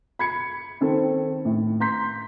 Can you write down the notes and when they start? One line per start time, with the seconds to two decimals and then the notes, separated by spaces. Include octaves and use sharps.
0.19 B5 G#6 C#7
0.81 D#3 C4 A4
1.45 A2
1.80 A#5 C6 G6 B6